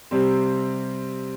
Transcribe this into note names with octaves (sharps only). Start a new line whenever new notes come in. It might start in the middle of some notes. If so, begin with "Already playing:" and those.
C3 G3 C4